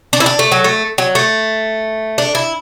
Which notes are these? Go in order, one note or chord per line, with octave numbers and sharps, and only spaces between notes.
D4
E4
D4
A3
F#3
A3
F#3
A3
D4
E4